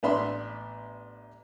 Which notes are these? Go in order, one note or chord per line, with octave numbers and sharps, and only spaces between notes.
A1 B3 D4 E5 B5 C6